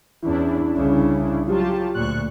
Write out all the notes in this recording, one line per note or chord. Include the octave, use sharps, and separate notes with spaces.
E2 C#4 D4 E4
C2 C#3
F#3 F4 G4 A5
D2 A#2 C#6 F#6